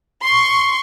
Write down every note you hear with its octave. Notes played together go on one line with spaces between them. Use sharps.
C6 C#6